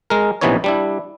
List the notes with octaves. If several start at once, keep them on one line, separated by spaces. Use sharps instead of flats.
G#3 A#4
A#1 C3 E3 B3 D#4 C#5
G3 D4 E4